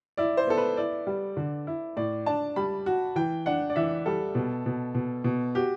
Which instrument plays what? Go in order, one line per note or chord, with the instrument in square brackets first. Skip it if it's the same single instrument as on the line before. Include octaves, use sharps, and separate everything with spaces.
[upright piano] E4 [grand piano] D5
[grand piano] C5
[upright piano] B3 [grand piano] A4
[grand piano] B4
[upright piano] E4 [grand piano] D5
[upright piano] G3
D3
E4
[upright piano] A2 [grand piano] D5
[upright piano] D4 [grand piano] A5
[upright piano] G3 [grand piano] B5
[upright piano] F#4
[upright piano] E3 [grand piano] G5
[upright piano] D4 [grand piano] F#5
[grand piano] D5
[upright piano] E3 [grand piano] E5
[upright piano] G3 [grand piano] A4
[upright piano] B2
B2
B2
B2
[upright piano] F#4 [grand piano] G4